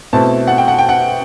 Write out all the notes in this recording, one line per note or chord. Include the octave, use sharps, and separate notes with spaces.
B2 A3 C4 E4 A5
F#5
G5
F#5
G5
F#5